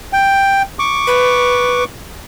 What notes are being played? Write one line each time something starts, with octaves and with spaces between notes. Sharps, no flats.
G5
C#6 D6
B4